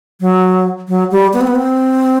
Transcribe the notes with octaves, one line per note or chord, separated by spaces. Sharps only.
F#3
F#3
G3
B3
C4
B3
C4